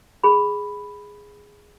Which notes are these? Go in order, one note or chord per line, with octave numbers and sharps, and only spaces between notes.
G#4 B5